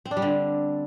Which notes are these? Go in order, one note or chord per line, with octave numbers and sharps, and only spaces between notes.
C4
D4
G3
D3